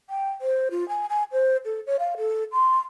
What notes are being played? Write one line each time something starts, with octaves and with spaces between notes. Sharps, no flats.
G5
C5
F4
G#5
G#5
C5
A4
C#5
F5
A4
C6